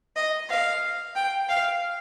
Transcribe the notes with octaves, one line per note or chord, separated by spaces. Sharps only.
D#5
F5
G5
F5